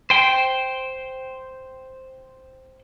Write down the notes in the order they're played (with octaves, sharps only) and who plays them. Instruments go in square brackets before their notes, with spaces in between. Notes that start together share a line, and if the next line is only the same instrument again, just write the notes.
[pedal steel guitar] C5 G5